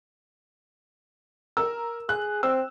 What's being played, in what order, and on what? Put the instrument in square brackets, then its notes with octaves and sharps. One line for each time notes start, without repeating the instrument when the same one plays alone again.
[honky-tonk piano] A#4 [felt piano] E6
[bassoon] G#4 [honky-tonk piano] F#6
[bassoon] C4 [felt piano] E6